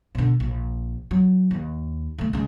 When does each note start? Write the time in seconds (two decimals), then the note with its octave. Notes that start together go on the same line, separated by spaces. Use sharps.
0.15 B2 D3
0.40 A#1
1.11 F#3
1.51 D#2
2.18 D3 A3
2.33 C#3 G#3